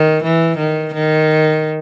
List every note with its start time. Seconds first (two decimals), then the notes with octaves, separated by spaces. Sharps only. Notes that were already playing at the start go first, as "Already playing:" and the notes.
Already playing: D#3
0.23 E3
0.57 D#3
0.94 D#3